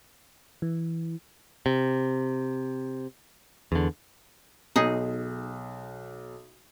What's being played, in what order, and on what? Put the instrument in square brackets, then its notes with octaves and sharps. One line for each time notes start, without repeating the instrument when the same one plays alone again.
[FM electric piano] E3
[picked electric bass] C3
E2 D3
[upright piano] B1 [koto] D#4 G#4